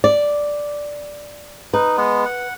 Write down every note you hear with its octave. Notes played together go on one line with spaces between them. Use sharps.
D5
D#4 B4
G#3 B3
F#5